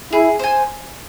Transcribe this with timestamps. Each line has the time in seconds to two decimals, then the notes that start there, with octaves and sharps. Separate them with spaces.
0.12 E4 G#4
0.39 C5 G#5